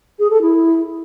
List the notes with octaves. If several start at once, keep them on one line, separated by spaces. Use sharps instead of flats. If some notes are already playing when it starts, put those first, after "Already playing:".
G#4
A4
E4